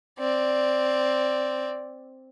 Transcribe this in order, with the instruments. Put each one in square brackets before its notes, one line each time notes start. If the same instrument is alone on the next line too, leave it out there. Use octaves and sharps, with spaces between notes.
[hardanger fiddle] C4 D5